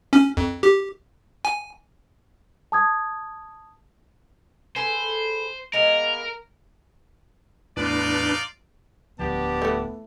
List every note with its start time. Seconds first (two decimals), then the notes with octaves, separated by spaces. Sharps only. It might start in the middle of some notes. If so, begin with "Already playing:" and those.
0.13 C#4
0.37 F2
0.63 G4
1.45 G#5
2.72 A5 D#6 G#6
4.76 G#4 A4 B4 C5
5.73 G#3 A#3 B3 A#4
7.77 E2 A2 E3 D4 D#4 F4 B4 D5
9.19 D1 D2 F3 B3 D4 G4 A5
9.62 E3 A3